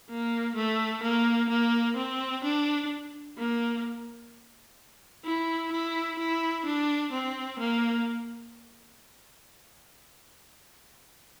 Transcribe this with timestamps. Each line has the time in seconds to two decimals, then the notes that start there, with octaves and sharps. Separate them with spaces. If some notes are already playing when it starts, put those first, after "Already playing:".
0.09 A#3
0.55 A3
1.02 A#3
1.49 A#3
1.96 C4
2.44 D4
3.38 A#3
5.25 E4
5.72 E4
6.18 E4
6.65 D4
7.12 C4
7.59 A#3